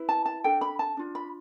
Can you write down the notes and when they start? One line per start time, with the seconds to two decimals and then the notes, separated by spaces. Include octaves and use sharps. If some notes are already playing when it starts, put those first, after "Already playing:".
Already playing: E4 B4
0.09 A5
0.26 A5
0.44 D4 A4 G5
0.61 B5
0.79 A5
0.97 D4 F4
1.15 B5